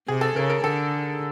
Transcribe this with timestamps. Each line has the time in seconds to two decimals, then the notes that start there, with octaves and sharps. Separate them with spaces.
0.08 C3 G#4
0.21 A4
0.36 C#3 A#4
0.50 A#4
0.64 D3 A4